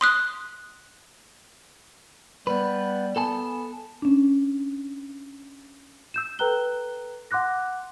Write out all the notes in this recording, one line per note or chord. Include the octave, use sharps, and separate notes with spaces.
C6 D#6 F#6
G3 B3 B4
B3 A4 G#5 A5
C#4 D4
E6 G6 E7
A4 B4 G5 A#5 F#6 G7
F#5 C6 D6 F#6 A#6